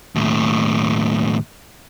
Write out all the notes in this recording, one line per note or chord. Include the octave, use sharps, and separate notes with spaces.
D#2 A2